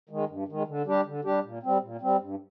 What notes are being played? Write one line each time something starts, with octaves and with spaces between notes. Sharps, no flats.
D#3 G#3
G2
D#3 G#3
D3
G3 D4 G4
D3
G3 D4 G4
A#2
G3 C4
A#2
G3 C4
G2